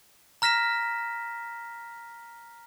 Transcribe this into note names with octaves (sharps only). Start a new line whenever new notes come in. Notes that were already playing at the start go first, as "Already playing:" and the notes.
A#5 F6 A#6 B6 E7